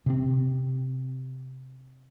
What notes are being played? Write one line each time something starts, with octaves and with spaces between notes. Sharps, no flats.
C3 C4